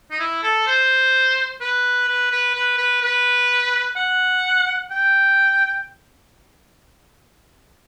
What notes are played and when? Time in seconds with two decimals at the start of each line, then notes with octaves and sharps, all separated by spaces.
0.11 D#4
0.19 E4
0.43 A4
0.67 C5
1.61 B4
2.08 B4
2.31 B4
2.54 B4
2.78 B4
3.02 B4
3.96 F#5
4.91 G5